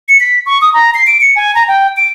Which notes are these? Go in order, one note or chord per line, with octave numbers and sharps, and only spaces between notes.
C#7
B6
C#6
D#6
A#5
C7
D7
C#7
G#5
A#5
G5
D7